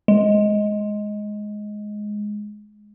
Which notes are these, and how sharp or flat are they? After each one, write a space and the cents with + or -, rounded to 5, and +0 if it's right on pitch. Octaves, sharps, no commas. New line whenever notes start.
G#3 +10